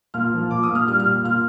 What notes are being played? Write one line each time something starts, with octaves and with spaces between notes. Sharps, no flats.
A#2 F6
F3
A#2 D6
D#6
A#2
F6
G3 F6
F6
A#2
A#2 F6